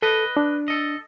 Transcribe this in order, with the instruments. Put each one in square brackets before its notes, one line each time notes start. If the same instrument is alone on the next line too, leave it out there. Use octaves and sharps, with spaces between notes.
[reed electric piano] A4 [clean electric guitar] B4 D#5
[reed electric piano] D4
[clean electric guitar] A4 D#5